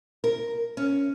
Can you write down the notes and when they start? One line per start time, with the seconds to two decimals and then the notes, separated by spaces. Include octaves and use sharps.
0.24 A#4
0.77 C#4